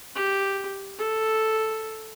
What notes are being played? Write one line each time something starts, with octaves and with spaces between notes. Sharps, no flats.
G4
A4